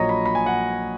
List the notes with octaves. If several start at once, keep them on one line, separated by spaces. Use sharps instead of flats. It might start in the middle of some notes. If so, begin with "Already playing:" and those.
Already playing: A#1 A#2 F#3 C#5 D#5 A#5
B5
B5
G#5
F#5